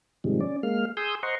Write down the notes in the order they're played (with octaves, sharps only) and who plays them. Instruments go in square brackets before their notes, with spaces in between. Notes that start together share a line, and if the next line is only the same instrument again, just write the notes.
[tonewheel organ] G#2 C3 D#3 F3 G3 G#3
C#4 D5
G#3 A#3 F5 F6
G#4 G#5 C6 D#6 E6 G6
C5 D#5 F#5 A#5 C6 C#6